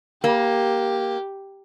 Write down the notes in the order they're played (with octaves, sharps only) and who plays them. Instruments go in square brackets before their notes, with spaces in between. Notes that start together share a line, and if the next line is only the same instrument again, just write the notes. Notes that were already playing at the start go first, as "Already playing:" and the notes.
[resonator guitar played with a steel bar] A#3 [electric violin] G4